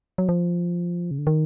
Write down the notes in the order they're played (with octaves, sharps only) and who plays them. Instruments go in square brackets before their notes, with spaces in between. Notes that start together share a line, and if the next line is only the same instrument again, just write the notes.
[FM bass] F#3
F3
C#3
D3
D#3